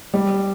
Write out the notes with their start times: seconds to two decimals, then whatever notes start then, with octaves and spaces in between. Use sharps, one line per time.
0.14 G3